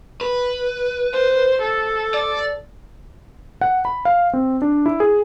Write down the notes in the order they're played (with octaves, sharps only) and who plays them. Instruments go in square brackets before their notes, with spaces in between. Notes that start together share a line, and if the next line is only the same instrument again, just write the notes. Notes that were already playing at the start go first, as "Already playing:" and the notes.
[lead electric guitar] B4
[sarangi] C5
A4
[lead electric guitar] D5
[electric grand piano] F#5
B5
F5
C4
D4
E4
G#4